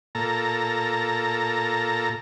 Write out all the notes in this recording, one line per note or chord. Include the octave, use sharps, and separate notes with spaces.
A#2 A4 A#5